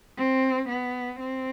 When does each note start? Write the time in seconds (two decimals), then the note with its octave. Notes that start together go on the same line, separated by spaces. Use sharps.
0.18 C4
0.69 B3
1.20 C4